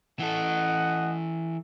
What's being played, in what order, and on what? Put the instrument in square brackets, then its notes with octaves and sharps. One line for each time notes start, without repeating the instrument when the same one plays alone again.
[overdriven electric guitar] E3 A4 [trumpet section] D#5 F#5